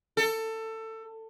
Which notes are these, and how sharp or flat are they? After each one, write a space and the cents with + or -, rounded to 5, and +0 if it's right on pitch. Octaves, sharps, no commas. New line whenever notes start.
A4 +20